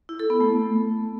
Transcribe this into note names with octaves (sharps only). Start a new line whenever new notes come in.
E4
A4
B3
A3